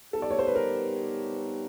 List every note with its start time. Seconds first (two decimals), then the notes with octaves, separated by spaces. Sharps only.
0.13 G3 B3 D#4 G4 A4
0.22 D5
0.31 C#5
0.39 C5
0.47 B4
0.56 A#4